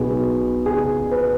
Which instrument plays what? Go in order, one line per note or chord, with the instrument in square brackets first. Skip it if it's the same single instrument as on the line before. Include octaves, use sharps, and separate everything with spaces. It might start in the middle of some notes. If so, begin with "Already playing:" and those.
Already playing: [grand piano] B1 B2 B3 G#4
G#4
B4